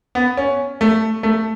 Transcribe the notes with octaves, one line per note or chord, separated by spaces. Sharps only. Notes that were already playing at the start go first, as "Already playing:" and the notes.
B3
C#4
A3
A3